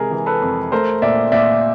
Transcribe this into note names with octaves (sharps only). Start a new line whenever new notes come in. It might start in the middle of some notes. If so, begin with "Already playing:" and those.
Already playing: C3 E3 G#3 G#4 A#4
E3
A4 B4
F2
A3 A#4 C5
A#2 D5 E5
A#2 D5 E5